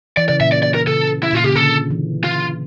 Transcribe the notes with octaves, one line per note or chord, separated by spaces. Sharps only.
E3 D5
C#3 D5
A#2 E5
D5
D5
A#4
C#3 A4
E4
A#2 F4
C#3 G4
D3 A4
E3
F4